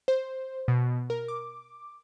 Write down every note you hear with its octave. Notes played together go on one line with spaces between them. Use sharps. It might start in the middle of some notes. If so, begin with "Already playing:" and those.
C5
B2
A#4
D6